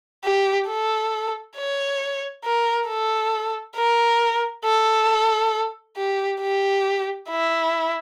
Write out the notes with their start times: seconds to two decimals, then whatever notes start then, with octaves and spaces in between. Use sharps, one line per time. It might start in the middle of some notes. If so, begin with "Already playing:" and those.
0.24 G4
0.68 A4
1.57 C#5
2.45 A#4
2.88 A4
3.76 A#4
4.65 A4
5.97 G4
6.41 G4
7.30 E4